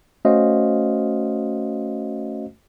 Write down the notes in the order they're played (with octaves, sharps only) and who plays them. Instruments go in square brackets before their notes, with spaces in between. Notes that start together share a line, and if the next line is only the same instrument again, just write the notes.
[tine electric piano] A3 C#4 F#4 C5 D#5 F5